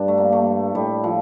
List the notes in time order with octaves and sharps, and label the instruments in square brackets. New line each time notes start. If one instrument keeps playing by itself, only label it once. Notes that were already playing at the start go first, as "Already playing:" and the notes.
Already playing: [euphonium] G2 [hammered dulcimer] D4
[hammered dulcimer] A3
A#3
A3
[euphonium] A2 [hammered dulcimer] G3
[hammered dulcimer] F3